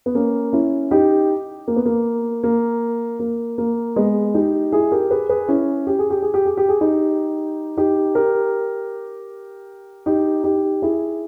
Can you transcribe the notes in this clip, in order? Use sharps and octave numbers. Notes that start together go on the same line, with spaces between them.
B3
A#3 C#4
C#4 E4
D#4 G4
A#3
B3
A#3
A#3
A#3
A#3
G#3 B3
D#4 G4
E4 G#4
G4 A#4
G#4 B4
G#4 B4
C#4 E4
G4
G#4
G4
G#4
G4
G#4
G4
G#4
D#4 G4
D#4 G4
G4 A#4
D#4 G4
D#4 G4
E4 G#4